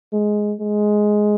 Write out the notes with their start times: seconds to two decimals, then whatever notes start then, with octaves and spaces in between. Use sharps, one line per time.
0.13 G#3
0.60 G#3